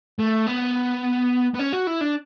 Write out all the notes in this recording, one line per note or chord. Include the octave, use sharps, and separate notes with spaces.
A3
B3
B3
C#4
F#4
E4
D4